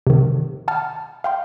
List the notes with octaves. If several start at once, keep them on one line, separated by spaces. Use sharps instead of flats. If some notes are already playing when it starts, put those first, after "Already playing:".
C3 D#3
F#5 A5 F6
F5 G5 C6